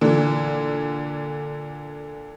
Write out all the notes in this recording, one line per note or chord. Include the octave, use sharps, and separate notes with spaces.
A#2 D3 E3